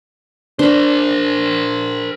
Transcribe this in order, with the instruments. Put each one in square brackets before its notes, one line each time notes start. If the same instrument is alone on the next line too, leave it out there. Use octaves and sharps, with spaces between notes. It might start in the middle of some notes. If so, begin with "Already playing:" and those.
[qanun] D4 [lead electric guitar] A#4 C5